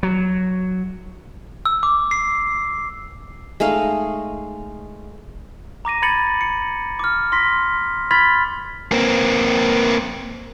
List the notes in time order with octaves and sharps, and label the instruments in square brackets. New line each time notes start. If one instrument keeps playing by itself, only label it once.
[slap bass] F#3
[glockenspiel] E6
D6
C7
[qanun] G#3 A3 D#4 F5
[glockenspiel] A#5 D6 A#6 D#7
B5 G#6 A6 C#7 F#7
C#7
D6 F6
C6 A#6 B6
B5 C6 F6 G#6 A6 B6
[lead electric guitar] A#3 C4